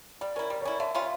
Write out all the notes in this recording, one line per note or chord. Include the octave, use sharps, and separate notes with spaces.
G3 D5
C#4 E4 A#4
G3 D5
C#5
C#4 E4 D5
D3 E5
G3 C#4 F4